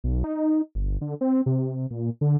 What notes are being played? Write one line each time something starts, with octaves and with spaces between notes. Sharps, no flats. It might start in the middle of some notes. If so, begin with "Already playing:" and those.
B1
D#4
G1
D3
C4
C3
A#2
D3